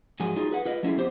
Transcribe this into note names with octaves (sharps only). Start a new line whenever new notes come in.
G#2 F3 F#3 G#4 G#5
F#3 D#4 F4 G#4
G#4 B4 F#5
F4 B4 D#5
F#3 A3 C#4 E4 G#4
F2 B3 G4 C5